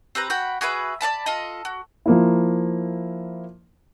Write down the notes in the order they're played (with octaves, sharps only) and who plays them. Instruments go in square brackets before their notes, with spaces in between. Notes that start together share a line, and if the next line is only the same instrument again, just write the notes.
[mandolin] C4 G4 B4 A#5
F#4 F#5 G5 B5
F#4 G#4 B4 E5
D5 E5 A5 B5
F4 A4 D#5
F#4
[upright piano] F3 A#3 E4